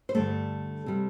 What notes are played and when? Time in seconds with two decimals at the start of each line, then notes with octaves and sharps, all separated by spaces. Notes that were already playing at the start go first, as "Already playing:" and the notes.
0.09 C5
0.15 G2 D3 G3 A3 A4
0.86 C3 G3